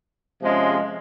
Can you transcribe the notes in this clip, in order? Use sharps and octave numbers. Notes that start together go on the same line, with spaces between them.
C3 F3 G#3 C#4